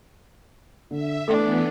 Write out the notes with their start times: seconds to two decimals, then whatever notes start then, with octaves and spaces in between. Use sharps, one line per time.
0.91 D3 E5
1.28 E3 A3 B3 D4 A4